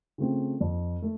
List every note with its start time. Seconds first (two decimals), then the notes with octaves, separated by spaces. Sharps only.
0.18 C#3 A3 C4 F4
0.61 F2
1.02 A3